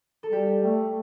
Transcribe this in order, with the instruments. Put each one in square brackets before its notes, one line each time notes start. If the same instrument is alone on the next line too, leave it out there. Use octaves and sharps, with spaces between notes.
[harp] A4
[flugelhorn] G3 [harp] G4
[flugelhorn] A3